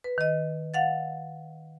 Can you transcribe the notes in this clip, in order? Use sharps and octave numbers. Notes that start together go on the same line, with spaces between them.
B4
D#3 D#5
F5 F#5 A6